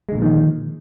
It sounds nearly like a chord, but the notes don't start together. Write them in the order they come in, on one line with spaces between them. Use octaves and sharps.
G#3 D3 A#2 F3 D#3